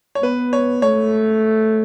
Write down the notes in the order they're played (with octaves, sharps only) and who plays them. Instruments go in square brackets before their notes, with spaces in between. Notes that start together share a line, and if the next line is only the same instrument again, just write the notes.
[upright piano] C#5
[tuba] B3 [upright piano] B4
[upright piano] C#5
[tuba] A3 [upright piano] C#5